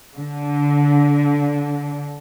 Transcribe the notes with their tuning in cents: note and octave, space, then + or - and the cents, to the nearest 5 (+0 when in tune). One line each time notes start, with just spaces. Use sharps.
D3 -20